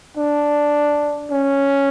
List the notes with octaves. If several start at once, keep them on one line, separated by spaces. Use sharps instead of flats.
D4
C#4